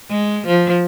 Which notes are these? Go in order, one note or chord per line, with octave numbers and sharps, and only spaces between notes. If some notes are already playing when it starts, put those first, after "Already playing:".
G#3
F3